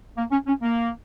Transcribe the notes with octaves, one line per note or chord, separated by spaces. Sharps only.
A#3
C#4
C#4
A#3